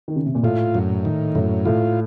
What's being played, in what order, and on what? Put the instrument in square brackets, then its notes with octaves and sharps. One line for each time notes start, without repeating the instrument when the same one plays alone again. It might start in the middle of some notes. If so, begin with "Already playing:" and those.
[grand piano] D#3
C#3
C3
A#2
[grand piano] A2 [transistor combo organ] F4
[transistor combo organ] F#2
D#3
[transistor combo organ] F#2 [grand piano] A2
[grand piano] A2 [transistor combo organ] F4